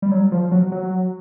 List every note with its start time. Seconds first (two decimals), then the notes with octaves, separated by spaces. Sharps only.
0.02 G3
0.11 F#3
0.32 F3
0.52 F#3
0.72 F#3